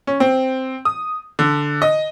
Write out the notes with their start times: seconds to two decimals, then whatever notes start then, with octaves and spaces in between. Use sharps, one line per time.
0.07 C#4
0.20 C4
0.85 D#6
1.39 D3
1.82 D#5